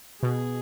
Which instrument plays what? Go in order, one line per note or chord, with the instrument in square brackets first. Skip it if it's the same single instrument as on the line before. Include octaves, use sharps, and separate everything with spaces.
[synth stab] B2 [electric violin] G#4